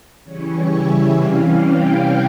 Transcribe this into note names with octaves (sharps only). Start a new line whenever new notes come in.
C#3 E3 G3 C#4 C#5
E5
C3 E3 G3 C#4 F5
G5